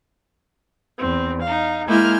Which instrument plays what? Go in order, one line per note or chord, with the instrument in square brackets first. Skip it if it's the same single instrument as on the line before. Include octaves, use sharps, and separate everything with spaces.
[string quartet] E2 C4
D#4 F5
[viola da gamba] G#3 A#3 E4 [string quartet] G#5 F6 G6